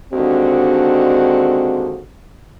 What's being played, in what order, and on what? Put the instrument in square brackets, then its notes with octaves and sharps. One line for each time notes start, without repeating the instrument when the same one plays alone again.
[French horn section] D#2 D3 G#3 C4 D4 F#4